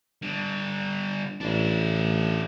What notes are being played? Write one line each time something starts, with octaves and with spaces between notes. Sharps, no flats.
D3 G3
A1 D4 E4